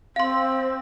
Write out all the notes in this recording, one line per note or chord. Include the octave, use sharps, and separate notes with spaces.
C4 F5 C6